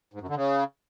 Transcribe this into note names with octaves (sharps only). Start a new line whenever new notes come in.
G#2
F#2
D3
C#3